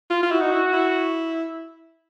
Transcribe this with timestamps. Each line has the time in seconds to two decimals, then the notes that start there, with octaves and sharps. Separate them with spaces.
0.10 F4
0.23 F4
0.31 E4 F#4
0.41 D#4
0.51 E4
0.73 E4